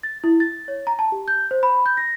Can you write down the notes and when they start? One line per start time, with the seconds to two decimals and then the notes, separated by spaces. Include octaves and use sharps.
0.03 A6
0.24 E4
0.40 A6
0.68 C#5
0.87 A#5
0.99 A5
1.12 G4
1.28 G6
1.51 C5
1.63 B5
1.86 G6
1.97 A#6